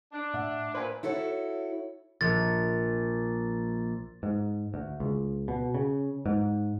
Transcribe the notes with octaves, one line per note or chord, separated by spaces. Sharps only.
D4
A2 E5 F#5
A#2 F4 B4 C5 G#5
E4 F#4 A4 C#5
A#1 A6
G#2
D2
C#2
B2
C#3
G#2